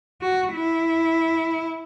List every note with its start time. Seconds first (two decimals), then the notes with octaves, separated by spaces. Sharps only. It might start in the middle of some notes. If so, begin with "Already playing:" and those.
0.22 F#4
0.53 E4